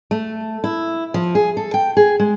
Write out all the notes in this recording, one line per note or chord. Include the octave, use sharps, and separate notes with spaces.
A3
E4
F3
G#4
A4
G5
G#4
G#3